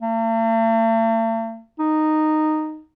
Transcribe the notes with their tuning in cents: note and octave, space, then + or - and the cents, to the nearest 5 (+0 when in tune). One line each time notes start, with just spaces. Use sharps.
A3 +45
D#4 -10